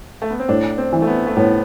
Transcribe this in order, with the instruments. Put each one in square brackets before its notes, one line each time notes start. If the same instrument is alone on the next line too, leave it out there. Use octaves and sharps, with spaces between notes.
[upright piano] A3
B3
C4
[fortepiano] A2 [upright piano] D4
[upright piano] C4
[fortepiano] E3
[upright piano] A3
B3
A3
[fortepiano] A2 [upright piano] B3